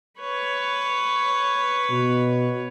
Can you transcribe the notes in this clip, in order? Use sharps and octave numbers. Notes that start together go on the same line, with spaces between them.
B4 C#5
B2